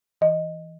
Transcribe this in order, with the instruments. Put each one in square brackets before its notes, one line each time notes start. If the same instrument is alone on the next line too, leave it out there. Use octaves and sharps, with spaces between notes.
[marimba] E3 D#5